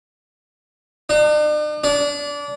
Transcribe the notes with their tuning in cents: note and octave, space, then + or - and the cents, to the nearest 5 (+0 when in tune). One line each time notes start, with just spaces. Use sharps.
D4 +45
D4 -25